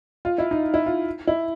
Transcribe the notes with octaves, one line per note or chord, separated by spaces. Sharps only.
F4
E4
D#4
E4
F4
E4